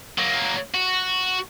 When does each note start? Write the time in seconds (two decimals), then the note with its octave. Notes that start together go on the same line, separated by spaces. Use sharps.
0.18 F#3 A#3
0.75 F#4